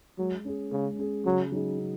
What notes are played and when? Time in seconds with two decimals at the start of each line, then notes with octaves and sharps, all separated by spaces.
0.18 F#3 G#3
0.45 C#4 G#4
0.72 C#3 G#3
0.98 C#4 G#4
1.25 C#3 F#3
1.52 F#3 D#4 G#4
1.79 C#3